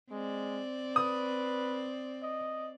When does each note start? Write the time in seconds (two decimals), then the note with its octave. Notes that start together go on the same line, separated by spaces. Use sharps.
0.11 G#3 C4 D5
0.96 B4 D#6
2.22 D#5